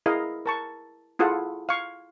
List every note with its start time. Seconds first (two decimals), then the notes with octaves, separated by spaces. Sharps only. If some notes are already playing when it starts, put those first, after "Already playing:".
0.06 E4 G#4 A#4 D#5 F5
0.46 A#4 A5 C#6
1.19 E4 F4 G#4 A4 F#5
1.69 F5 C#6